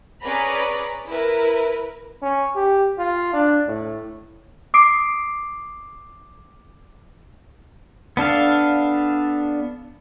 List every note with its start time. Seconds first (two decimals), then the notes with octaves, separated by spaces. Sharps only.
0.23 C#4 G#4 B4 D5 A#5 B5
1.09 E4 A#4 B4
2.22 C#4
2.56 G4
2.98 F4
3.33 D4
3.68 A2
4.74 D6 D#6 C7 D7
8.17 B3 D4 A4 F5